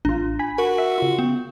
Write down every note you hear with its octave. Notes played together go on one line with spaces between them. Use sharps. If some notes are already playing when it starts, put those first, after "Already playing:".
A1 D4 F4
G#5 B5
F#4 A#4
E5
C#3 F4
B3